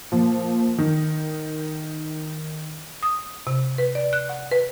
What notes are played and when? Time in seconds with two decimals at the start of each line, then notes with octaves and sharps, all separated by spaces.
0.12 A#2 F3
0.78 D#3
3.03 D#6
3.47 C3
3.78 B4
3.95 D5
4.13 F#6
4.29 F#5
4.51 B4